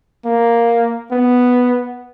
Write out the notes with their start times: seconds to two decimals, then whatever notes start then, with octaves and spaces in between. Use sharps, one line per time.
0.25 A#3
1.12 B3